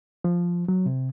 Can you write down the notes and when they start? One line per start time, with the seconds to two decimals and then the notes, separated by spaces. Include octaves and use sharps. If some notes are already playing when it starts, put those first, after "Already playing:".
0.24 F3
0.68 F#3
0.86 C3